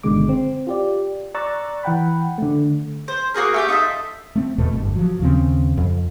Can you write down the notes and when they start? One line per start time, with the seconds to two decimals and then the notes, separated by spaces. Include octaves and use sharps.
0.03 G1 B2 D3 D#3 G#3 D6
0.29 C4
0.67 F4 G4 D5
1.34 D5 A#5 C#6 E6 F#6 A6
1.83 E3 F#5 G5 B5
2.38 D3 A3
3.08 C5
3.34 A#3 F#4 G#4 A#4
3.54 A3 G4 G6
3.68 D#4 F4 A4 E5
4.36 A3 C4
4.58 E2 B2 A3
4.73 G1 G2
4.95 F3 F#3
5.20 D#2 C#3 C4
5.77 F2